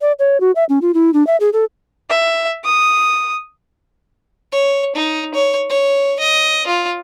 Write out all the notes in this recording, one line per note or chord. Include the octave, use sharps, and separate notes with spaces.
D5
C#5
F#4
E5
C#4
F4
E4
D4
E5
G#4
A4
E5
D#6
C#5
D#4
C#5
C#5
D#5
F4